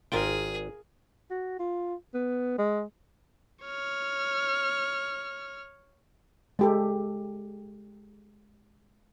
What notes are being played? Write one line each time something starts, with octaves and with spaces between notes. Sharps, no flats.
G#1 F4 G#4 A#4 G5
F#4
F4
B3
G#3
C#5 F6
G#3 G4 A4